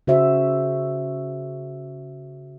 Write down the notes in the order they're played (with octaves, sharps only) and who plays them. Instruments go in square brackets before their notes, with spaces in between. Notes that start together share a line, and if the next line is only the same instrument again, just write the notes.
[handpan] C#3 F#4 C5 E5